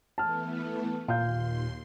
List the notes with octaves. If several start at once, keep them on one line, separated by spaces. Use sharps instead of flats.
E3 A3 B3 A5 F6
D#2 A#2 F5 C6 G6